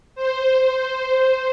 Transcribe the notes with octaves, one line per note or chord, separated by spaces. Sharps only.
C5